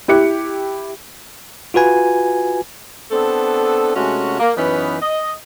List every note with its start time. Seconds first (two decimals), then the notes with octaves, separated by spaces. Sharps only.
0.08 E4 G4 F#6 C#7
1.74 F4 F#4 B4 G#5
3.11 B3 C4 D4 A4
3.95 C3 G#3 A3 C#4 F#4
4.39 A#3
4.56 F#2 E3 B3 C#4 D#4 B4
5.02 D#5